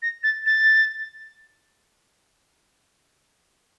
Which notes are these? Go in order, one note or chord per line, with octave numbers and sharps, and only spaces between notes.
A#6
A6
A6